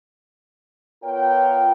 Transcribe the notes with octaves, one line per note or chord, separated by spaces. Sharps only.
B3 F4 A#4 C#5 G5